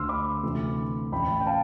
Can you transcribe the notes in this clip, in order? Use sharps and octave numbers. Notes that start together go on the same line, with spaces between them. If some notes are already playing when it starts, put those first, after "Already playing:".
Already playing: D2 D3 C6 E6 F6
B5 D6
D2 C3 E3
A1 A2 E3 G5 B5
G5
F5 A5